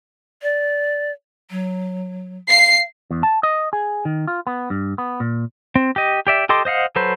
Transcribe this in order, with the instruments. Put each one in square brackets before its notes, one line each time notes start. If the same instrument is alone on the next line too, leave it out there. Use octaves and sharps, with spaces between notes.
[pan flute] D5
F#3
[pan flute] F5 [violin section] C7
[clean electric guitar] E2
A5
D#5
G#4
D#3
F4
B3
G2
B3
A#2
[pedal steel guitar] C4
G4 D#5
G4 D5 E5
G4 A4 D#5 C6 D6
C5 D#5 F5 F#5
F#3 A4 B4 C5